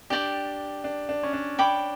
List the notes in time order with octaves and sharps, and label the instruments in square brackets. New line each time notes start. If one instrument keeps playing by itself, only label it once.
[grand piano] D4 [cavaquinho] G4 D5 G5 D6
[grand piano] D4
D4
C#4
D4
[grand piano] D4 [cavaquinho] C#5 G5 B5 D6